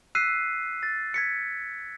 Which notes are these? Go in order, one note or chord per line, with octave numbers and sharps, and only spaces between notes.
E6 F#6 B6 C7 D#7
A6
G#6 B6 C#7